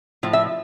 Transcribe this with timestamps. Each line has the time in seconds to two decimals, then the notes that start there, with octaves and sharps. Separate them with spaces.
0.23 A2 F3
0.33 E5